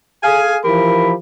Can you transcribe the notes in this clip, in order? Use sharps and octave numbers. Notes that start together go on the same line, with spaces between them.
G#4 A4 F5 G#5
E3 F3 G4 A#4 B5